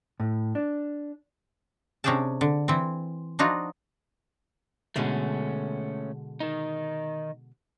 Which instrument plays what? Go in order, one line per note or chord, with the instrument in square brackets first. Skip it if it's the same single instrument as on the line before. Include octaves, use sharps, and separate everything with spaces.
[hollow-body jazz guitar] A2
D4
[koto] C3 C#4 D4 G#4 G5 A5
D3
E3 C4
F3 D4 D#4 F4 F#4
[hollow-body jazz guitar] B2 D3 G#3 [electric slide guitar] A3 C#4
[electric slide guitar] D#3 D#4